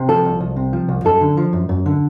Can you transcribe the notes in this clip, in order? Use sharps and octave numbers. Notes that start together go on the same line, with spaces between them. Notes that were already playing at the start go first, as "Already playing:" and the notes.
Already playing: C3
F3 A4
C2
C2
C3
F3
C2
F#2 A4
D3
F3
F#2
F#2
D3